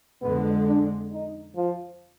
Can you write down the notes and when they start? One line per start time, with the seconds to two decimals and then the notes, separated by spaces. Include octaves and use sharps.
0.22 F2 D3 G#3 B3
0.67 D4
1.13 D#4
1.56 F3